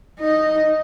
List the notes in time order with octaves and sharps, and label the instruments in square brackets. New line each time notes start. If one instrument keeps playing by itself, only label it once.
[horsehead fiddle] D#4 D#5